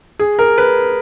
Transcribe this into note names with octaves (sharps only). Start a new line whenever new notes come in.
G#4
A#4
B4